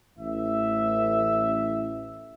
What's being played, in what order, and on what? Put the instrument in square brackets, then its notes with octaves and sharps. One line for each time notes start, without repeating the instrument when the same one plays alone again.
[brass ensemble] A1 E3 E5